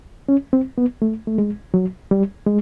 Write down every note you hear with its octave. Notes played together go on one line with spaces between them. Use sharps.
C#4
C4
B3
A3
A3
G#3
F#3
G3
G#3